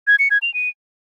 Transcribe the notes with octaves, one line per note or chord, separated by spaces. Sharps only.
G#6
C#7
G#6
F7
D#7